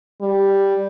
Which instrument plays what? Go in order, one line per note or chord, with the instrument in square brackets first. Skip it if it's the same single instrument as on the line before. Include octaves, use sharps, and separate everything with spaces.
[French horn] G3